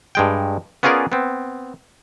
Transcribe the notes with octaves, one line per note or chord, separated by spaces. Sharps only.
G2 G#3 G5
B3 C#4 F4 G#4 A#4 D5
B3 C4